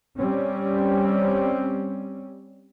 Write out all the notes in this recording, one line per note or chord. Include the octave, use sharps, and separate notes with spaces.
G3 C4 C#4